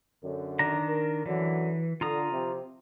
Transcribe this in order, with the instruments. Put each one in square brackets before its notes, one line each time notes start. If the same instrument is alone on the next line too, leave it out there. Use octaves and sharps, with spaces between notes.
[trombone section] F#2 D3
[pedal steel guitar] D#3 D4 A#5
[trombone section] A#4
[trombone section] F#2 D3 F#3 [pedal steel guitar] E3
[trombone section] D3 [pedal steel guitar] F4 A#5 D#6
[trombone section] C3 F3